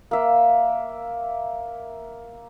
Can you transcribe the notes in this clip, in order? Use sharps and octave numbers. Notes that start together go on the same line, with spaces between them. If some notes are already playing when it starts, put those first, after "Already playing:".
A#3 E5